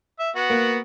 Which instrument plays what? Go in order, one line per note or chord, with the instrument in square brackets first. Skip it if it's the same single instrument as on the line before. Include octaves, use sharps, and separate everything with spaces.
[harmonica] E5
B3 F#4
[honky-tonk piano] A#3